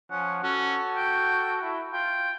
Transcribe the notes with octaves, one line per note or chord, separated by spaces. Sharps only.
F3 C#4 F#5
C#4 F#4 A4
G5
E4
F4 G5